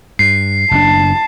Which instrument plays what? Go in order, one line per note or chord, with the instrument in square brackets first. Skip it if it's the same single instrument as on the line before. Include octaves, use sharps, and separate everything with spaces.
[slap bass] G2 [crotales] C7
[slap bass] F#1 F#2 D4 [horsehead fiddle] A5